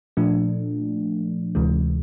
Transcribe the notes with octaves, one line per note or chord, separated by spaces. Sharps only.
A#2 F3 A3 D4
D2 C3 E3 G#3